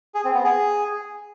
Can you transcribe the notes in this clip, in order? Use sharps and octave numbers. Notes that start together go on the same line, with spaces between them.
G#4
C4
B3
G#4